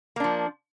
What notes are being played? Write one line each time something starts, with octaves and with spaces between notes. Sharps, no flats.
F3 A#3 D4